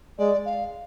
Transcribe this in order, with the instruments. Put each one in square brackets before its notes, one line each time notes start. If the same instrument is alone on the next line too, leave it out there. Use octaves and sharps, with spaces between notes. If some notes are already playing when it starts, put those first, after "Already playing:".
[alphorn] G#3 [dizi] D5
[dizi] F5